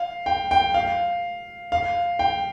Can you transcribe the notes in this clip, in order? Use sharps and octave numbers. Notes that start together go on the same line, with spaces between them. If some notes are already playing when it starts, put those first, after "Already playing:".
Already playing: F5
G5
G5
F5
F5
G5